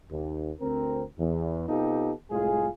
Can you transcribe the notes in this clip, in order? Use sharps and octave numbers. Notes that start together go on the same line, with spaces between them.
D#2
D2 C4 A#4
E2
C3 B3 D#4 F4 G4 A4
C2 A2 G#3 F4 G#4